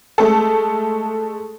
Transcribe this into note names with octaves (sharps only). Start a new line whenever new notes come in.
G#3 A3 A4